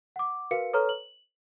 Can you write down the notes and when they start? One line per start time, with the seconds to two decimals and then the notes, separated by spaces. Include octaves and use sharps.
0.16 F#5 D6
0.51 F#4 A#4 B4 F5 C#7
0.73 A4 B4 C#5 A#5 C#6 F6
0.89 F#7